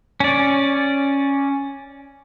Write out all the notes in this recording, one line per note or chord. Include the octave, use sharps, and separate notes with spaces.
C#4 D5